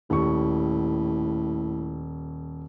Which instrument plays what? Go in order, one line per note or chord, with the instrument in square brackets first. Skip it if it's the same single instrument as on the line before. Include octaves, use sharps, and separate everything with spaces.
[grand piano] D#1 C#6 [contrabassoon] A2